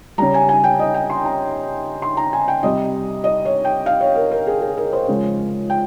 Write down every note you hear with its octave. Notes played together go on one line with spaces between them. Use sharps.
C#3 G3 A#5
G#5
G#5
G5
D#5
G5
C6
A#5
C6
A#5
G#5
G5
C3 G3 D#5
D#5
C#5
G5
F5
C#5
A#4
A#4
G#4
G#4
A#4
C5
C#3 F3 G#3
G5